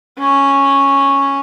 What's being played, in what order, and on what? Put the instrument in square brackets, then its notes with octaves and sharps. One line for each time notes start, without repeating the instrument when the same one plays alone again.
[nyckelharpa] C#4